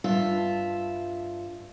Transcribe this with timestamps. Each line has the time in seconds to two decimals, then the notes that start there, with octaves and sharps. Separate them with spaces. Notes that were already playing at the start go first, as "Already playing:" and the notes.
0.04 G2 F4 E5 A5